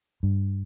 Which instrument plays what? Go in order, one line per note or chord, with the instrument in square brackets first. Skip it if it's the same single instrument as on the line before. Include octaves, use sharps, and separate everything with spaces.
[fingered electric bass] G2